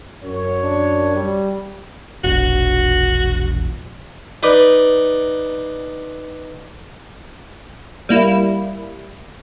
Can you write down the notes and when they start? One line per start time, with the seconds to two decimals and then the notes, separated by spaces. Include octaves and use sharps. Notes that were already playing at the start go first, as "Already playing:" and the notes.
0.23 F#2 C#5
0.63 D4
1.16 G3
2.24 E1 A#1 F#4
4.43 D#4 B4 D5
8.09 G3 A#3 E4